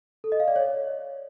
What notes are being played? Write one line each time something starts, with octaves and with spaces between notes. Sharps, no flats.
A4
D#5
F5
D5
C#5